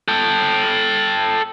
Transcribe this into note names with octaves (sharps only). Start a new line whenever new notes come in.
A4 G5